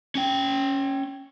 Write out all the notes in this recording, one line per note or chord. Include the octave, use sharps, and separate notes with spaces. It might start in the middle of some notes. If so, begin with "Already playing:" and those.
C#4 G5